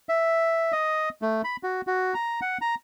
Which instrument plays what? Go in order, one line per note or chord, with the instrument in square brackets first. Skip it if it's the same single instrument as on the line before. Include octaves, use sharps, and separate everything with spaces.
[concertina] E5
D#5
A3
B5
F#4
F#4
A#5
F#5
A#5